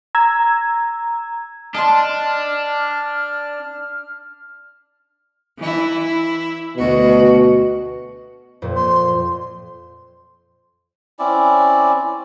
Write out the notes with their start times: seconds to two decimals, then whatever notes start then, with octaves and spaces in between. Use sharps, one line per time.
0.15 A#5 E6 G#6
1.74 D4 D#5 A5 C6 F6
5.59 E3 E4
6.03 E4
6.77 D2 B2 F#4
8.62 F2 A#2
8.76 C6
11.19 C4 C#4 E4 D5